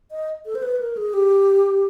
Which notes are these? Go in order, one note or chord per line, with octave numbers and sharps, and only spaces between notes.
D#5
A4
C5
B4
A#4
G#4
G4